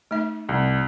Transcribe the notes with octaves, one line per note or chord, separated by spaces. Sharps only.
A3 D#4 E5
C2